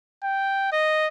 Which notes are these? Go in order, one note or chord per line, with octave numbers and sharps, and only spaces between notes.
G5
D#5